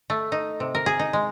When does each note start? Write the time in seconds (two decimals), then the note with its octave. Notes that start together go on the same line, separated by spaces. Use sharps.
0.10 A3
0.32 D#4
0.60 C3
0.75 A#4
0.86 G#4
0.99 D#4
1.13 G#3